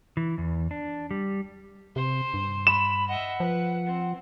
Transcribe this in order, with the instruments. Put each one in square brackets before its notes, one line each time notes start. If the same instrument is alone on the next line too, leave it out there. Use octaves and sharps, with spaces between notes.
[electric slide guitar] E3
E2
D4
G3
[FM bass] C3 [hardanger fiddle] C5
[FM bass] G2
[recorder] B5 [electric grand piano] E7
[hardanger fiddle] D#5 E5 [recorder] F#5
[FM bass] F3 [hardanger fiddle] B4
[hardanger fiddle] C4